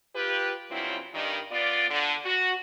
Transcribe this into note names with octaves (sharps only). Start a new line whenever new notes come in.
F4 G4 B4
G2 C#3 F#3 C4 E4 F4
G2 D#3
B3 F4 D5
D3
F#4